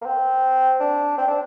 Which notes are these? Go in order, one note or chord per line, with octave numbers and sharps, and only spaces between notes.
A#3
C4
D4
C4
D4